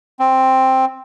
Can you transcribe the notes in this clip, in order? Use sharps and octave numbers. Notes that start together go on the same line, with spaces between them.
C4